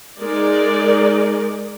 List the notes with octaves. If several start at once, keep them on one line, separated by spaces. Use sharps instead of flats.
G#3 D#4 A#4 D5